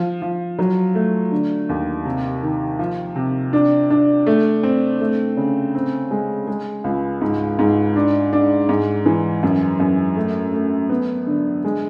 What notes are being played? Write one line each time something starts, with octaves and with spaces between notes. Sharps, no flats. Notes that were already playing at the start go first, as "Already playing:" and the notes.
Already playing: F3
F3
F#3
A3
D3
D#2
C3
D#3
F3
C3
D4
D4
A3
C4
A3
C#3
C4
G#3
G#3
C#2
G#2
G#2
D4
D4
G#2
E3
F#2
F#2
A3
A3
B3
D3
G#3